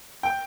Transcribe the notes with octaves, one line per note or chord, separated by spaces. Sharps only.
G5